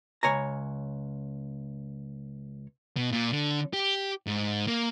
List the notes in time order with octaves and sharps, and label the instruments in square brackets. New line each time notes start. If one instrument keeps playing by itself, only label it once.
[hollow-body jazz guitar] C#2 C#5 G#5 A#5
[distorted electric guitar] B2
A#2
D3
G4
G#2
A#3